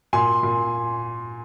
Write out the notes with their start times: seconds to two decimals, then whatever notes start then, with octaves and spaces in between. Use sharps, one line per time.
0.13 A#2 G#5 C6
0.43 A#2